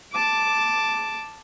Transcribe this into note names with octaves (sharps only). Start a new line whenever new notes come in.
A5 D6